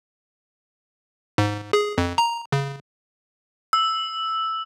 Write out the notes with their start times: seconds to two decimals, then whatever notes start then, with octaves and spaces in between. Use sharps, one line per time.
1.38 G#2
1.73 G#4
1.98 F2
2.18 A#5
2.52 C#3
3.73 E6